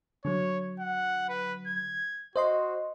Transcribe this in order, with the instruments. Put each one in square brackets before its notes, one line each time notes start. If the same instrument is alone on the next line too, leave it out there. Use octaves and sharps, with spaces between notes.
[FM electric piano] D3 F#3 [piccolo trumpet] C#5
[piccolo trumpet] F#5
B4
G#6
[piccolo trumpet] F#4 [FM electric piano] C5 D#5 C6